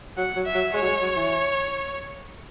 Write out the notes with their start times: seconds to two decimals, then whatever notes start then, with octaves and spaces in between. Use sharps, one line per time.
0.17 F#3 F#5
0.36 F#3
0.46 E5
0.55 F#3
0.74 G#3 C#5
0.82 F#3
0.88 G#3
1.02 F#3
1.16 E3